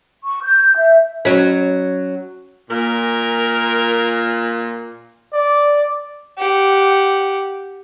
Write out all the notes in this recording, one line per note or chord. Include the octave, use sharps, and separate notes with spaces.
C#6
G6
E5
F#3 C#4
A#2 A#4
D5
G4 F#5